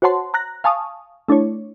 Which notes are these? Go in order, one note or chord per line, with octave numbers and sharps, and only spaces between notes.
F#4 C5 C#5 F#5 A5 C6
A#5 F#6 A#6
F5 G#5 A5 C#6 D#6
A3 D4 E4 C#5